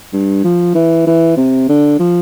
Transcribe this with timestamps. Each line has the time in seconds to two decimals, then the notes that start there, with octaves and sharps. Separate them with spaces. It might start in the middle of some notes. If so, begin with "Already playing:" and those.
0.13 G2
0.44 F3
0.75 E3
1.07 E3
1.37 C3
1.69 D3
1.99 F3